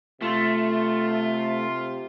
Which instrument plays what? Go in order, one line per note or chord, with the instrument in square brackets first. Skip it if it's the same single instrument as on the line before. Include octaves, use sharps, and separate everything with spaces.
[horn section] C3 F4 [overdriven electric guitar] A3